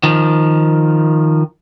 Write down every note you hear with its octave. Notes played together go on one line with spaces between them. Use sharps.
D#3 F3